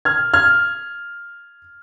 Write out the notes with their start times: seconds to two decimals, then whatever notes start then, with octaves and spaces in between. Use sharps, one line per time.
0.05 F6 G#6
0.34 F6 G#6